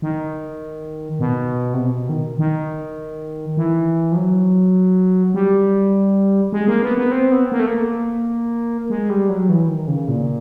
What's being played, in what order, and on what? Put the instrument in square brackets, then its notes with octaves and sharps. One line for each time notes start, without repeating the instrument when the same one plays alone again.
[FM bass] D#3
B2
C3
B2
D#3
D#3
E3
F3
F#3
G3
G#3
A#3
B3
B3
C4
B3
A#3
A3
A#3
G#3
G3
F#3
E3
D#3
C#3
A#2